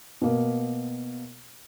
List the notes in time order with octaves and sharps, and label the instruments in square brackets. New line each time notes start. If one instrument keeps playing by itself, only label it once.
[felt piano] B2 A#3 A#4